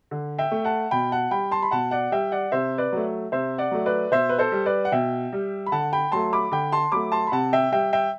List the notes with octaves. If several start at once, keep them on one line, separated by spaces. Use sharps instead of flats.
D3
E5 G5
A3
F#5 A5
B2 G5 B5
F#5 A5
G3 G5 B5
A5 C6
B5
B2 F#5 A5
D5 F#5
G3 E5 G5
D5 F#5
C3 C5 E5
B4 D5
F#3 A3
C3 C5 E5
D5 F#5
F#3 A3
B4 D5
B2 C5 E5
B4
A4 C5
G3
B4 D5
F#5
B2 E5 G5
G3
B5
D3 F#5 A5
G5 B5
F#3 A3 A5 C6
B5 D6
D3 G5 B5
A5 C6
F#3 A3 B5 D6
A5 C6
B5
C3 F#5 A5
E5 G5
G3 E5 G5
E5 G5